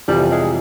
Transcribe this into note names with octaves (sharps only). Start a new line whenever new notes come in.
F2 C3 E3 G3
G#3